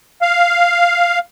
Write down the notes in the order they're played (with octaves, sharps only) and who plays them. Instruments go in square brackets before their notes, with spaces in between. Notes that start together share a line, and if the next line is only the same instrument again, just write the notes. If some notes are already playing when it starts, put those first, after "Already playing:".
[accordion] F5